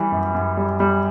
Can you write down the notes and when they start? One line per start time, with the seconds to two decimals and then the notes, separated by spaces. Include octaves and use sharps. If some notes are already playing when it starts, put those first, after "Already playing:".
Already playing: E3 G3
0.12 F#2
0.35 F#2
0.57 G3
0.80 G3